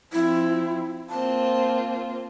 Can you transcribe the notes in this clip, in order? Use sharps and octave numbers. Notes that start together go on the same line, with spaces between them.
F3 C4 E4
A#3 C4 F4 A5